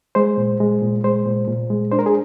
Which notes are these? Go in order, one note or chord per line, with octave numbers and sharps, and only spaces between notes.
G#3 C5
A#2
G#3
A#2
G#3 C5
A#2
A#2
G#3
D4 C5
A#4
G#4